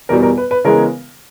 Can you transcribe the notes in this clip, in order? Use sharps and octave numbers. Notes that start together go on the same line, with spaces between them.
E2 B2 G3 A#4
A#4
B4
B4
C#3 E3 G#3 B3 A#4